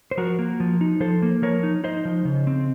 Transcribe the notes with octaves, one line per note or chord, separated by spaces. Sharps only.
C5
F3 F#4 A#4
A#3
F3
D#4
F3 A4 C5
A#3
F3 A#4 C#5
D#4
D#4 C5 D#5
F3
C#3
C4